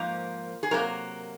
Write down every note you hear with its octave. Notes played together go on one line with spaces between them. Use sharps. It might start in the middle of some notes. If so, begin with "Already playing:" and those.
Already playing: G#2 F3 A#3 A#4
G#4
C3 F#3 A#3 A#4